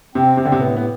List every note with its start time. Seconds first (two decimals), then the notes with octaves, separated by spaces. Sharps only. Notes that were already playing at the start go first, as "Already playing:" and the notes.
0.15 C3 C4
0.37 C3
0.45 D3
0.50 A2 C3
0.61 B3
0.77 B3